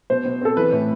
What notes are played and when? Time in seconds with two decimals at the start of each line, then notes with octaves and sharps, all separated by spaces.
0.10 B2 C5
0.25 B2
0.41 C4 A4
0.57 E3 B4
0.72 A2